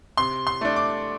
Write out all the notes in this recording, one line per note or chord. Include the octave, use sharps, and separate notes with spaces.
C3 C6
C6
A3 D4
D6